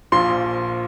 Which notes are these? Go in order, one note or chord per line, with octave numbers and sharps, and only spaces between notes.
A#1 A#2 F3 C6